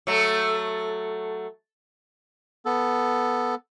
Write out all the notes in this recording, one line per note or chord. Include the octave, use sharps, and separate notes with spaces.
F#3 A3
B3 A4